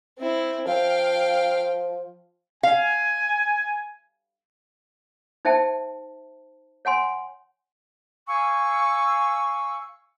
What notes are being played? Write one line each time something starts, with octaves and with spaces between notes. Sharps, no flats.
C4 E4
F3 F5 G5
F5 G#5
D#4 C5 E5 G5 A5
C#5 F#5 G#5 C6
F5 G#5 C#6 E6